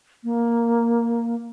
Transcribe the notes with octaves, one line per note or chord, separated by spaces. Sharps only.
A#3